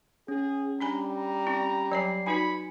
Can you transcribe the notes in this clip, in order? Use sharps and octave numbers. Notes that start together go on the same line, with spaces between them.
C#4 G#4
G3 D4 G#5 A#5 B5
A#5
C4 E4
F#3 C#5 D5 G#5 C7
D#4 F#4 B4 G#5 B5 C#7